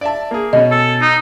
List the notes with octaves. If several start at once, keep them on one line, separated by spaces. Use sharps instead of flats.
D5 E5 A5
A#3 G#4
B2 C#4 D#5
A4
D#4